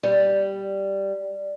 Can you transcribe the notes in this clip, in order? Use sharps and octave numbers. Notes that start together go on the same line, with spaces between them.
G3